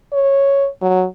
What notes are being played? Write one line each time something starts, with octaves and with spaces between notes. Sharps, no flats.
C#5
F#3